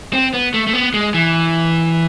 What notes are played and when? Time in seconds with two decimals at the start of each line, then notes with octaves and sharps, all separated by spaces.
0.13 C4
0.34 B3
0.54 A3
0.67 A3
0.73 B3
0.94 G#3
1.14 E3